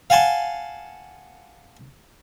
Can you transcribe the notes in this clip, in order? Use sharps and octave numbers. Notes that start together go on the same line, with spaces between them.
F5 F#5 G#5 A5 C6